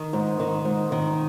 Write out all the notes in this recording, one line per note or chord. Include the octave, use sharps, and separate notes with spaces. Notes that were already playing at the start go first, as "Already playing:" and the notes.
Already playing: D#3
G#2
D#3
G#2
D#3